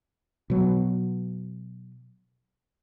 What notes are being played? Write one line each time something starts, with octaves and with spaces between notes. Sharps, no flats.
B2 F#3